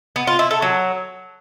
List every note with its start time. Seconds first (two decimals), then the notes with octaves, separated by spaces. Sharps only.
0.16 B3
0.27 F4
0.39 E4
0.51 A4
0.62 F#3